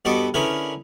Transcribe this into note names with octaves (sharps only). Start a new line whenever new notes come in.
G2 B3 F#4 A4 D#5 D6
D3 C#4 E4 G#4 A#4 B4